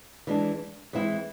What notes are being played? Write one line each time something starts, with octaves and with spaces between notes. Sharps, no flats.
E3 G#3 D4
E3 G#3 C4 E4